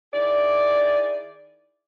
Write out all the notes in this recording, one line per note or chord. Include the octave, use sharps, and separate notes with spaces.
D#3 E4 G#4 D5